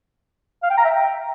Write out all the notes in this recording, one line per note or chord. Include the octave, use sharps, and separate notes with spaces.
F5
G5
A#5
E5
G5